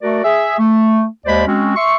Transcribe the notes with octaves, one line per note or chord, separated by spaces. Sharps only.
A3 F#4 A#4 D5
G#4 E5
A3
D#2 G#3 C5 D5 B5
G#3 C4 C#4 F#4
E5 C6 C#6